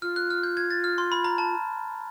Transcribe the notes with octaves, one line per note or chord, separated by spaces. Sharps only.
F4 F6
F#6
F6
G6
G#6
A6
F6
C6
B5
A#5
A5